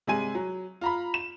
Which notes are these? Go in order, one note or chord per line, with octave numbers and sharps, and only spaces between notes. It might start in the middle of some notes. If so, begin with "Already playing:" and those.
C3 G3 G#3 G#5 D#7
F#3
F4 A#5 B5
E7